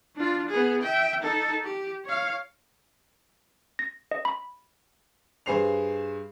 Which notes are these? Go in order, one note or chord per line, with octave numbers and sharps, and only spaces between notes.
D4 F4
B3 G#4
E5 G5
D#4 A4
G4
C#5 F5
A#6
D#5
B5
G2 G#4 B4 C5 C7 F7